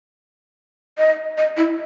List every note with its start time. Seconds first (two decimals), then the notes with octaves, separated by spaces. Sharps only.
0.98 D#5
1.38 D#5
1.57 E4